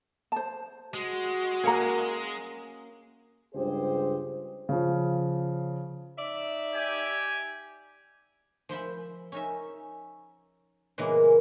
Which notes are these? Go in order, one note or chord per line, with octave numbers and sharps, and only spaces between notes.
C5 A5
G#3 F#4
A#3 C#4 A#4 F#5 A#5
C#2 G2 G4 G#4 C5
C#3 F3
D#4 D5 E5
G4 G#5
F3 C5 E5 B5
C#4 D#4 E5
A#2 C#3 E3 G#3 A#3 B3